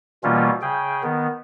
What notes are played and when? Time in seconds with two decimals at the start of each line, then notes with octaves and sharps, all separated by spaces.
0.24 B2 E3 G3 A#3 C#4 F4
0.62 C#3 G#4 G5
1.03 D#3 B3